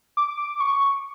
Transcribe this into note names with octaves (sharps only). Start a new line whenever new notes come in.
D6
C#6